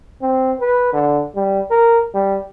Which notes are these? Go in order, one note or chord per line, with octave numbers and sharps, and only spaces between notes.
C4
B4
D3
G3
A#4
G3